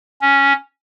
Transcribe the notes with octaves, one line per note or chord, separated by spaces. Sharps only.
C#4